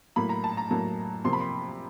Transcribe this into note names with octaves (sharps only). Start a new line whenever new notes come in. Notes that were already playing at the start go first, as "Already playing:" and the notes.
A2 F#3 A#3 B5
A#5
A5
A#5
A2 F#3 A#3
C3 F3 A#3 C6
B5
C6